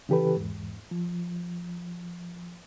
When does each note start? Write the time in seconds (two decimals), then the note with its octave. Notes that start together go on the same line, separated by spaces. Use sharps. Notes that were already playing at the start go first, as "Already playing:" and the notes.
0.09 C#3 E3 G4 A4 B4
0.36 E2 G#2
0.91 F3